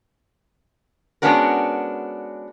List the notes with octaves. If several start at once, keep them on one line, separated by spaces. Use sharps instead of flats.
G#3 B3 C#4 D4 F#4 A#4